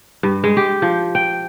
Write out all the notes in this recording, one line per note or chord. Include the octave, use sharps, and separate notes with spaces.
G2
G#3
G4
F3
G5